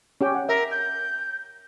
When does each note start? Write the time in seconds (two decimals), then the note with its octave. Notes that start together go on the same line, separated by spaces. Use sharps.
0.21 C#4 G4 G5
0.35 F#5
0.49 A#4 E5
0.71 G6